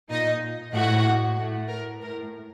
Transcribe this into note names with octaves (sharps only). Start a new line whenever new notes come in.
A#2 D#4 D#5
A2 F#4 F#5
A2
A#4
A2 A#4